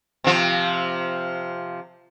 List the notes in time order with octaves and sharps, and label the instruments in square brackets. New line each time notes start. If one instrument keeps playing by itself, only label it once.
[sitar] C3 F3